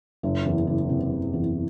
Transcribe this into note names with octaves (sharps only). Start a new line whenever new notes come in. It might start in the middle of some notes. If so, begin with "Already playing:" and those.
F#1
E2
F#1
C3
F#1
E2